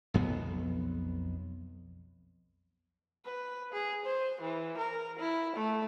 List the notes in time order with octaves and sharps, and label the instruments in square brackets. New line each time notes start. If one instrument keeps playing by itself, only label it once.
[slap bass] B1 F2 B3
[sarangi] B4
G#4
C5
E3
A#4
E4
A3